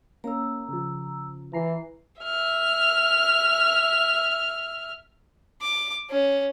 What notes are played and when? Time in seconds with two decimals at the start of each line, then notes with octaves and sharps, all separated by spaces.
0.24 A#3 C#4 A#5 E6
0.69 C#3 F3
1.53 E3 A#5 C7
2.21 E5 F6
5.61 D6
6.09 C#4